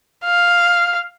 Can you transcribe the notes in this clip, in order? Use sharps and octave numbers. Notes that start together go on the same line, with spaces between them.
F5